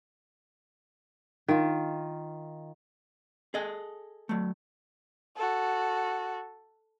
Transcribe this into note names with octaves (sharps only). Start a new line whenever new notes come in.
D#3 F4
G#4 A4 D#5
F#3 A3
F#4 A4